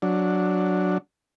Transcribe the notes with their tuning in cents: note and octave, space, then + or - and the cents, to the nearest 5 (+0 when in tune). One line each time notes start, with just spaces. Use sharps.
F#3 -5 D4 +0